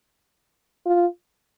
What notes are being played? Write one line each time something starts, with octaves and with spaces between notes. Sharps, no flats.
F4